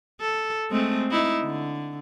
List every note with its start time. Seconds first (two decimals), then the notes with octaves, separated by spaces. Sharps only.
0.21 A4
0.70 G#3 A3 C4
1.11 D#4 E4
1.41 D3